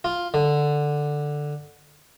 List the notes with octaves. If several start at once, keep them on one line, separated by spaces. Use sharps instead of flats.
F4
D3